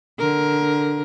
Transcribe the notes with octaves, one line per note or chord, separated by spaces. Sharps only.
D3 A#4